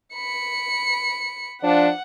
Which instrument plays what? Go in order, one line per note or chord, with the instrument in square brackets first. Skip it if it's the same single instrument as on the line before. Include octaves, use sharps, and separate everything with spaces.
[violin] B5 C#7
[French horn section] F3 D4 [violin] F#5